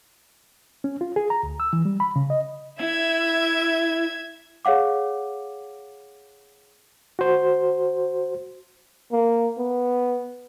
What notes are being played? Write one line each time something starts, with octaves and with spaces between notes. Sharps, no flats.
C#4
F4
G#4
A#5
D2
E6
E3
G3
B5
C#3
D#5
E4 E5 G#6
G#4 C#5 F5 F#5 D6
F#4 C5
A#3
B3